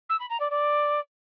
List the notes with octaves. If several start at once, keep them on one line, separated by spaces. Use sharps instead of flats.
E6
B5
A#5
D5
D5